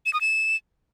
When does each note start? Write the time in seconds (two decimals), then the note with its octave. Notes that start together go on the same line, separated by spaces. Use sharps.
0.06 E7
0.13 D#6
0.21 E7